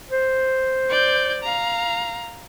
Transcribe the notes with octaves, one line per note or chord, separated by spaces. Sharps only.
C5
D5 G6
F5 A#5